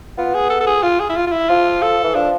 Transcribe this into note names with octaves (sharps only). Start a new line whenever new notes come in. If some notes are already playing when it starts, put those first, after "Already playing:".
B3 F4
G#4
A4
A4
G#4
F4
G#4
E4
F4
F4
E4
F3 F4
A4
E3
F3 D4